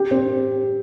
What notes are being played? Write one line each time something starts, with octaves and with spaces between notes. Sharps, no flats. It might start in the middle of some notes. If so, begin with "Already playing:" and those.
Already playing: G4
C4